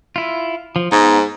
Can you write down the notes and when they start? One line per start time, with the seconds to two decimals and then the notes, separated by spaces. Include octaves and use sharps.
0.16 E4 F4
0.76 F3
0.92 G#2 B3 D#4